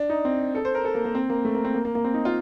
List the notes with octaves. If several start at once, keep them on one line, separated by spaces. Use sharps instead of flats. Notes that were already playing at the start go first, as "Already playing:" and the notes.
Already playing: D4
D#4
C4
A4
C5
A#4
A4
A#3
A#3
C4
A#3
A3
A#3
C4
A#3
A#3
A#3
C4
D#4
F4